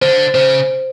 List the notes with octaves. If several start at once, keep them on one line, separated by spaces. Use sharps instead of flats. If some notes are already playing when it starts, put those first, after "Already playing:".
D3 C5
C#3 C5